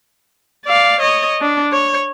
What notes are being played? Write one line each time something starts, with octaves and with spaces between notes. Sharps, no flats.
D5 F5
C#5 D#5
D4
C#5